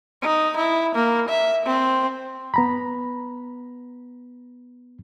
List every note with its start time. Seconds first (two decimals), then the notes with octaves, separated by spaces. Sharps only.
0.22 D#4
0.56 E4
0.95 A#3
1.29 E5
1.65 C4
2.54 B3 A#5 B5